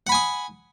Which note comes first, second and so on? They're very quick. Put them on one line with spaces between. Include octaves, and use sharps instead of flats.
F#5 B5 G#5 D#6